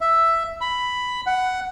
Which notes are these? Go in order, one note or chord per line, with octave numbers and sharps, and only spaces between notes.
E5
B5
F#5